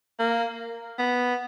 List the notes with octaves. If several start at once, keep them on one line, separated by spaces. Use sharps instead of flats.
A#3
B3